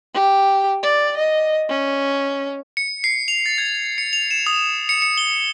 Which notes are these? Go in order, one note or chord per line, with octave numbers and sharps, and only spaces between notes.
G4
D5
D#5
C#4
C#7
C7
F7
A6
G#6
C#7
F7
E7
D#6
C#7
C#7
G7